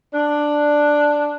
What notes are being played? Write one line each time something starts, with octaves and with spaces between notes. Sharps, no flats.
D4